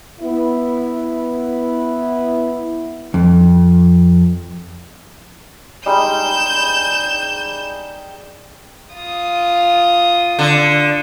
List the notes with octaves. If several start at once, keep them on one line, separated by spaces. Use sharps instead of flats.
B3 E4
F2
G3 G#3 D#4 G6 E7
F4 D#6
D3